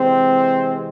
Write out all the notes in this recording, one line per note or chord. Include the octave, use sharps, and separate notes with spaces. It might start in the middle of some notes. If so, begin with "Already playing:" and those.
Already playing: C3 E3 G#3 C4